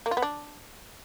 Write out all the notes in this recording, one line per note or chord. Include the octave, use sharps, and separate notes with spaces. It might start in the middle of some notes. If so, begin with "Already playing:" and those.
A#3
F4
B3
D4